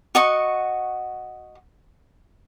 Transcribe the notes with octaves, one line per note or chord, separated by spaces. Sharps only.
F#4 D#5 C#6